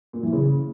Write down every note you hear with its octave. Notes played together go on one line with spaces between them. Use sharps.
A#2
E3
C#3